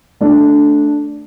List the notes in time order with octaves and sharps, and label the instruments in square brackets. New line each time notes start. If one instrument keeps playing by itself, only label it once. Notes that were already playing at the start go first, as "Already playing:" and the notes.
[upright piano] A3 D4